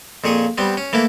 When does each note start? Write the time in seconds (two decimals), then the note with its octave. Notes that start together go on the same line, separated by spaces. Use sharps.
0.24 F2 A#2 G#4 C#6 D#6
0.58 G3 B3 C4
0.77 C#4
0.93 E3 A3 A#3 E4